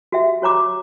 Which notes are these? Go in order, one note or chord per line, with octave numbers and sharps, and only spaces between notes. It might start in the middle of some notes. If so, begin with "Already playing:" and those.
F#4 G4 E5 F#5
F#4 C#5 A#5 D6